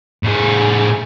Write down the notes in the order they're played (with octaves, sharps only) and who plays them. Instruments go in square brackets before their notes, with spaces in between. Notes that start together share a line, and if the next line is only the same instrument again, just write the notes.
[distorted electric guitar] A2 G#4